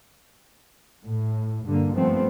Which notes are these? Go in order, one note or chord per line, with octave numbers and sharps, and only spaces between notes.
A2
G2 D3 A#3
G2 F3 A3 B3 C4